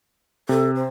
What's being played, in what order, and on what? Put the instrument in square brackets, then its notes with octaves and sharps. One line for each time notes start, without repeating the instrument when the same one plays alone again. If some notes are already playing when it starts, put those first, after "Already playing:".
[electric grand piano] C3 [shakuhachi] A4
[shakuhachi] C5